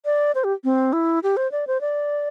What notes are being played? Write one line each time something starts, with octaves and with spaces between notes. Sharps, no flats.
D5
C5
G4
C4
E4
G4
C5
D5
C5
D5